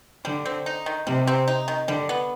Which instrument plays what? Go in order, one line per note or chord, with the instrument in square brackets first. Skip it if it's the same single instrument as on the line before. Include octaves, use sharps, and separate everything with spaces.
[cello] D3 [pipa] G3
[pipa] C4
D#4
D#3
[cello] C3 [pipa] G3
[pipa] C4
D#4
D#3
[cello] D3 [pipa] G3
[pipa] B3